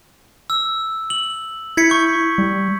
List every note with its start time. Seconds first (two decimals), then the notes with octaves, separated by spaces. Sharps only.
0.50 E6
1.10 F#7
1.77 E4 G#6 B6 C#7
1.90 C#6 G6
2.38 G3